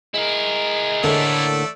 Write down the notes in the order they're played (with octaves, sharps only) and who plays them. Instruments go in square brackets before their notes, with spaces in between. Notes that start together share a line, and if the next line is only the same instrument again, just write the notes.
[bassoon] G#3 [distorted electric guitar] E4 A#4
[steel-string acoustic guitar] A2 D3 A#3 [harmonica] A3 D5 E6